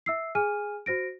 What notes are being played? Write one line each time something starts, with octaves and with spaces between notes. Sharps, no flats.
E5 E6 C7
G#4 G#5 F6 D#7
F#4 C5 A#6 D7